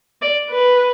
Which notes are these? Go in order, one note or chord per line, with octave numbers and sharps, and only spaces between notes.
D5
B4